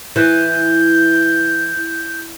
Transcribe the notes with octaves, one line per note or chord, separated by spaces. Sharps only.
E3 G6